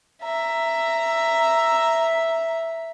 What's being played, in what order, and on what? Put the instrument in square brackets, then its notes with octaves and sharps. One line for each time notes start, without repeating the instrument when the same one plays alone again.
[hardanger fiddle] E5 A#5